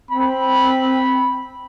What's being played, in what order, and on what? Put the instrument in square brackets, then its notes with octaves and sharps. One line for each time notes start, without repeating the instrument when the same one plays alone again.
[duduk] C4 [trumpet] B5